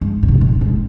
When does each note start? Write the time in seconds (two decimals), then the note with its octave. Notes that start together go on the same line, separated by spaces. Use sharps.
0.01 G#2
0.23 A#2
0.28 C3
0.41 A#2
0.61 G#2